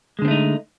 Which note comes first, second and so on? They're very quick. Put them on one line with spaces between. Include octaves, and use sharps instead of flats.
G#3 D3 C4 A3 D#4